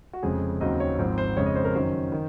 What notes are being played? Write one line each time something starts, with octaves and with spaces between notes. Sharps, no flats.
F#4
F1 F2 C#3 G#3 G#4
D#2 C#3 F#3 C4 D#5
C#5
G#1 G#2 F3 C4
C5
F2 C#3 G#3 C#5
D#5
C5
A#4
F#2 D#3 F#3 C#4 C5
D#3